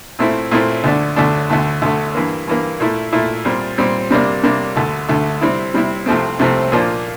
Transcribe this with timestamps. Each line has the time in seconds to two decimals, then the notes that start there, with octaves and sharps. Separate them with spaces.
0.19 A#2 A3 C4 E4
0.51 A#2 A3 C4 E4
0.84 D2 D3 A3 D4
1.16 D2 D3 A3 D4
1.50 D2 D3 A3
1.82 D2 D3 A3
2.15 G2 E3 A#3
2.47 G2 E3 A#3
2.80 A#2 A3 E4
3.13 A#2 A3 E4
3.45 A#2 G3 C4
3.78 A#2 G3 C4
4.11 C3 G3 A#3 D4
4.43 C3 G3 A#3 D4
4.76 D2 D3 A3
5.09 D2 D3 A3
5.41 C3 G3 C4 E4
5.74 C3 G3 C4 E4
6.06 C2 C3 F3 A3 C4
6.39 C2 C3 F3 A3 C4
6.72 A#2 F3 A#3 D4